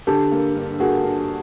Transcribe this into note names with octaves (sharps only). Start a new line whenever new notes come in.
D3 G4 A4
A#3
G2
A#3 F#4 G#4
G2